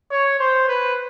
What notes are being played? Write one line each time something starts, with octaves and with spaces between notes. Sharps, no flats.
C#5
C5
B4